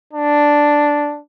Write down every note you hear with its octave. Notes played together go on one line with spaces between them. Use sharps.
D4